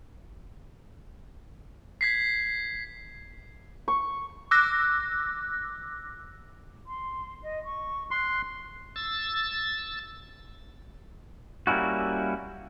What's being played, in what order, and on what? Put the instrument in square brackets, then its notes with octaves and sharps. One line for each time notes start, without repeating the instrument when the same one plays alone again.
[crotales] G#6 B6 C7
[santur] C#6
[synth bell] D6 E6 F#6 A#6
[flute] C6
D#5
C#6
[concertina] C6 [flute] F#6
[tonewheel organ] E6 A6
[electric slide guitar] G3 A#3 C#4 E4 F#4